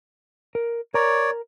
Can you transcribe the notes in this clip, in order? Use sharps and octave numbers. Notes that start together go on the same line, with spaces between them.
A#4
A#4 C#5 D5 A#5